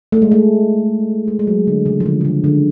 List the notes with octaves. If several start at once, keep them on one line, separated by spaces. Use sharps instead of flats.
A3
G#3
A3
G#3
G#3
F#3
D3
C#3
F3
D3
D3
C#3
D3